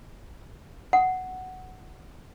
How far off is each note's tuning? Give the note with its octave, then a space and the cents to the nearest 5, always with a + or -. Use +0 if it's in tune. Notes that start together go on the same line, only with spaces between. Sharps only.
F#5 +5